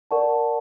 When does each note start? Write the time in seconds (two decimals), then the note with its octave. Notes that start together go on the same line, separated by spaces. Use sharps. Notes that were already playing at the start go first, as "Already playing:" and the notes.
0.11 A#4 D5 F#5 A5 C#6